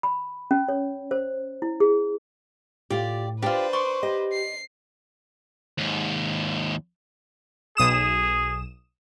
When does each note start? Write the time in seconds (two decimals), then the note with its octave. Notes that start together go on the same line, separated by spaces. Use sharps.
0.03 B5
0.51 C#4
0.69 C#5
1.11 C5
1.62 E4
1.80 G#4
2.90 A2 F4 G4 D5
3.42 D4 F4 G4 B4 C5
3.73 D5 C6 C#6
4.03 G4 D#5
4.32 C7
5.78 D#2 G#2
7.77 B1 G#4 D#6 E7